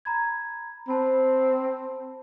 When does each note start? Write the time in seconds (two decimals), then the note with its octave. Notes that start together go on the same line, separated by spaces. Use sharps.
0.05 A#5 B5 G#6
0.88 C4 C5 A5 B5